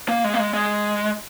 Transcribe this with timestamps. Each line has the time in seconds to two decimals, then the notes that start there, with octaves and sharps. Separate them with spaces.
0.09 A#3
0.24 G#3
0.34 A#3
0.39 G#3
0.54 G#3